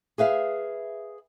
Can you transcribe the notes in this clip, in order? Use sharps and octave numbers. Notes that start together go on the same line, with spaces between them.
G#4 B4 E5 F5